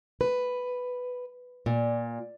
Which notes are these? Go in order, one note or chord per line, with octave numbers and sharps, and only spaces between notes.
B4
A#2